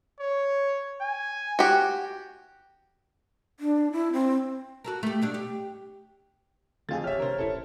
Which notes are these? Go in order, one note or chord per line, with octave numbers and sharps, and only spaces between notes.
C#5
G#5
F#4 G4
D4
E4
C4
F#4 A4 A#4
A3 G4
B2 G3 D4
G4
F2 D3 A3 F4 G#4 A6
D1 A1 E3 G4 C#5 E5 F6
C3 D4 A#4 C5
D1 A#1 C#4 E4 A4